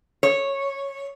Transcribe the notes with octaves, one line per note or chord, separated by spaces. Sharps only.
C#5